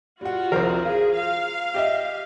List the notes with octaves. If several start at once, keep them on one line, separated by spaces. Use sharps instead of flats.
G3 F4 F#4 F#5
C2 F2 A#4 C5
F4 G#4
F5
G4 D#5 E5